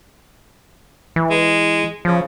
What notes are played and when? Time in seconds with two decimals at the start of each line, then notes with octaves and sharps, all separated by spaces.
1.16 E3
1.31 G#3
2.05 C#3 F3